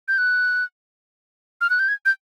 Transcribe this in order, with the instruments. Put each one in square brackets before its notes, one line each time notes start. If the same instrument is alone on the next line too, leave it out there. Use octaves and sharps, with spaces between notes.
[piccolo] G6
F#6
F6
F#6
G6
G#6
G6